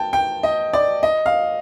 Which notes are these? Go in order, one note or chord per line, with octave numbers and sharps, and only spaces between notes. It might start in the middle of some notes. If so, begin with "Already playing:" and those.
Already playing: G5 A5
G5
D#5
D5
D#5
F5